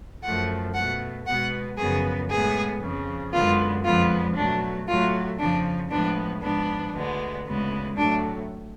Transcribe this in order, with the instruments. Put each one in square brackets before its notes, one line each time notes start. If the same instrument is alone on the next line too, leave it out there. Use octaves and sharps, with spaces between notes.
[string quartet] F#2 F3 A3 F#5
B2 A3 F#5
B2 G#3 B3 F#5
F#2 C#3 F3 B3 G#4
A2 G#3 B3 G#4
F2 C#3 F3
F#2 D3 G#3 B3 F4
F2 D3 F3 G#3 B3 F4
B2 F#3 A3 D4
A2 F#3 A3 F4
F2 C#3 F3 D4
A2 F3 G#3 B3 D4
G#2 F3 B3 D4
D2 D3 G#3 B3
D2 C#3 G#3 B3
A2 F#3 A3 D4